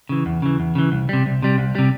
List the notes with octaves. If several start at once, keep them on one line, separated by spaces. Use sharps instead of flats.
C#3 E3
E2
C#3 E3
E2
C#3 E3
C2
C3 G3
C2
C3 G3
C2
C3 G3